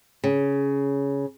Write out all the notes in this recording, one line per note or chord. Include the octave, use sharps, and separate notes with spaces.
C#3